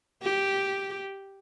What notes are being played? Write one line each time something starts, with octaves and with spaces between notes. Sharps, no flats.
G4